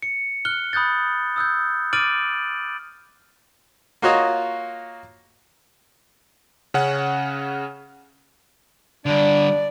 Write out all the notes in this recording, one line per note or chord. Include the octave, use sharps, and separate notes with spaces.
C#7
F6 F#6 G7
B5 D#6 F#6 G6 A6
D#6 E6 F#6 G6
D6 F6 A6 D7 D#7 F#7
A#3 F4 F#4 C#5 D#5
C#3 C#4 F#5
D3 G3 D4 D5